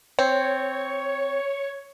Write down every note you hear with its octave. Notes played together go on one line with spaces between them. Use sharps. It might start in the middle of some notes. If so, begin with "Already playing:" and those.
C4 C#5